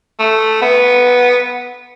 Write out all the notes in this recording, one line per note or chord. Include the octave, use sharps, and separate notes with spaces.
A3
B3